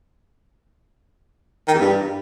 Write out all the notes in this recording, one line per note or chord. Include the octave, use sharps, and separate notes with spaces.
D#3
E2
G2